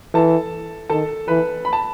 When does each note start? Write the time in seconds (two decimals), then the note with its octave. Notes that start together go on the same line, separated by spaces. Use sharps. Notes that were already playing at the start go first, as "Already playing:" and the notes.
0.14 E3 A4 A5
0.90 D#3 A4 A5
1.28 E3 B4 B5
1.65 B5
1.73 A5